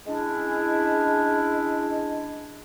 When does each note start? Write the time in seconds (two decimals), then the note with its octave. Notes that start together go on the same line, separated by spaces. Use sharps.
0.07 G#3 C#4 D4 E4